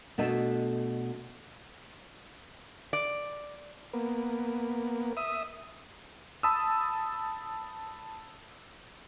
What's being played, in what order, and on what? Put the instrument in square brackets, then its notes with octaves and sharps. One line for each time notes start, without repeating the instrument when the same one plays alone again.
[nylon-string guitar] B2 A3 D4 D#5 A5
[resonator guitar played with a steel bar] D5
[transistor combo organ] A#3 B3
E5 D#6
[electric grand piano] A5 B5 D#6 E6